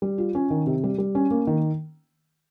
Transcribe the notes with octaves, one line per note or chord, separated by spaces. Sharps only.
G3
F4
C#4
D#3
C3
G3
G3
C#4
A#3
D#3